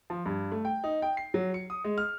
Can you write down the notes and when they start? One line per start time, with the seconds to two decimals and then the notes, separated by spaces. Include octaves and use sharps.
0.10 F3
0.26 G2
0.52 A3
0.65 G5
0.84 D#4
1.02 G5
1.17 C7
1.34 F#3
1.54 C#7
1.70 D#6
1.84 G#3
1.98 F6